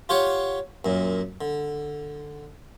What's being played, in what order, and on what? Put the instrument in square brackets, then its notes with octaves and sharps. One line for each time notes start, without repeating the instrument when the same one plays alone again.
[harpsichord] F4 G4 C#5 F#5
F#2 A#2
D3